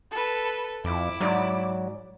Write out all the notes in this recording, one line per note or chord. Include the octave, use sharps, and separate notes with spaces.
A4 B4
F2 E4 D6
G#2 F#3 D5